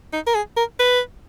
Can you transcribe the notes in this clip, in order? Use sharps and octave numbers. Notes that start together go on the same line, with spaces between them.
D#4
A#4
G#4
A#4
B4